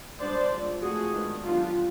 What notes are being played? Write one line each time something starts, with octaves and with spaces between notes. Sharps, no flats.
G3 B3 D4 C5 D5
F3 G#3 C4
F3 A3 C4 F#4 G#4
D#3 G#3 B3 D4
D#3 F#3 B3 D4 F4 G4